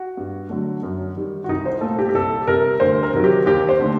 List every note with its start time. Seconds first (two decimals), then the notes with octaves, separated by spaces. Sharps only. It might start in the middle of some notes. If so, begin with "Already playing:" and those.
Already playing: F#4
0.17 G2
0.49 D3 F#3 A3
0.83 F#2
1.16 D#3 G3
1.44 F#4
1.49 C2 D#4
1.66 C5
1.81 A#2 A3 A4
1.99 G4
2.09 G4
2.14 C2 A4
2.47 C3 G3 A#4
2.80 D2 C5
3.03 A#4
3.14 C3 D#3 F#3
3.24 G4
3.46 D#2 G4
3.69 C5
3.79 D3 A3